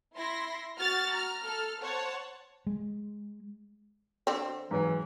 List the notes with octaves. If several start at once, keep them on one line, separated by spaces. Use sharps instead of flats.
E4 C6 A#6
F#4 F6 A6
A#5 F6
A4 F6
C5 C#5 F#5 A5
G#3
D3 C4
G#2 E3 F#3